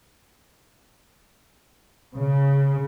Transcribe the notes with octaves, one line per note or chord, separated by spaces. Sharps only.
C#3